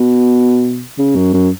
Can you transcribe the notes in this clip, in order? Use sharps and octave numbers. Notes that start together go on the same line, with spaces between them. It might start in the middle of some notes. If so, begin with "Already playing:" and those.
Already playing: B2
C#3
F#2
F#2